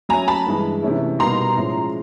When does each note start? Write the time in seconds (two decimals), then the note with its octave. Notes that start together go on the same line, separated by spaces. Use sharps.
0.09 F#3 A3 C#4 G#5 A#5
0.28 A5 B5
0.47 G2 E3 G#3
0.82 C3 E3 A3 C#4 E4
1.19 B2 G3 A#3 D#4 A#5 C6
1.57 A2 F3 G#3 C#4